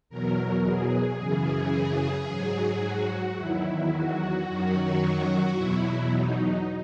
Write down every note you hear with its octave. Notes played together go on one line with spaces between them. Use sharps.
E2 B2 F#3 A#4
G#4
F#2 C#3 E3 G#4
G#2 F#3
F#4
E2 D#3 F#3 E4
F#4
F#2 D#3 F#3
E2 B2 F#3 E4
D#4